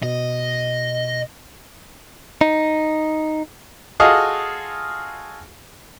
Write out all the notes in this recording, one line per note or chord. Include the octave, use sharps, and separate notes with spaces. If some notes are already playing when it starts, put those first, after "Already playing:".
B2 D#5
D#4
F4 F#4 G#4 A4 D#5 F5